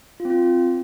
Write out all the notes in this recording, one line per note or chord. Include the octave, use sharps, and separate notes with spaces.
F4
C4
F4